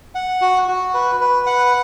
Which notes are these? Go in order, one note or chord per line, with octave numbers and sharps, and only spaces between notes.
F#5
F#4
F#4
B4
B4
F#5